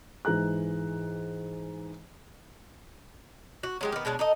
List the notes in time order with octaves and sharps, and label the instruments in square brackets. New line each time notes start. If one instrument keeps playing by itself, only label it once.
[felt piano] G#2 E3 G#4 A#5 F#6
[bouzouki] F#4
F#3 G#3 G4
D#3 B3
B2 G#3 D4 C#5
D#4 A4 D#5